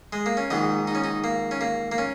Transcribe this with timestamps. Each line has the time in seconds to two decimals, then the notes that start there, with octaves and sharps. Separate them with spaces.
0.13 G#3
0.26 A#3
0.37 C#4
0.50 A#1 G#2 D#3 D#4
0.88 D#4
0.95 C#4
1.04 D#4
1.24 A#3
1.51 C#4
1.61 A#3
1.92 A#3
1.98 C#4